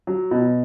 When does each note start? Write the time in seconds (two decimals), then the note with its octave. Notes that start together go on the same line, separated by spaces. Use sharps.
0.07 F#3
0.31 B2